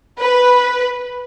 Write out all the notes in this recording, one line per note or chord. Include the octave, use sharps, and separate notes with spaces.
B4